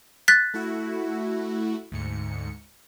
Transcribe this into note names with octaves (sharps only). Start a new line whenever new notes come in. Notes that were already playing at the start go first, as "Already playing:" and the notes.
F#6 A6 B6
A3 E4 F#4
D2 G#2 C#7